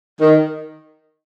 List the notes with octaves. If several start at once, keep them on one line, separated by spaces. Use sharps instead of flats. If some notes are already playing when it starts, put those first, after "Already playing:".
D#3